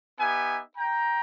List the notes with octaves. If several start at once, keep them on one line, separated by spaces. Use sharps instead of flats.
B3 D#4 G4 E5 G#5
G5 A#5